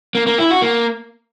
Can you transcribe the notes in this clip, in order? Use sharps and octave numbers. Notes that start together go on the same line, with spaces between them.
A#3
A#3
E4
F#4
A#3